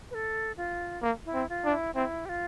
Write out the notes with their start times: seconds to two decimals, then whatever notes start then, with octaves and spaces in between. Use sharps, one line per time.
0.11 B4
0.14 A4
0.57 F4
1.02 A#3
1.25 E4
1.34 C4
1.49 F4
1.65 D4
1.72 E4
1.95 C4 E4
2.25 G4
2.29 F4